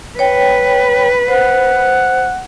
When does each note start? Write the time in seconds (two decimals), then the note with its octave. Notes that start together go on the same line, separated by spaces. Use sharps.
0.19 B4 C#5 G5
1.28 C5 F#5